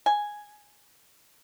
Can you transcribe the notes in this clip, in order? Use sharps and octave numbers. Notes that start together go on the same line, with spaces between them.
G#5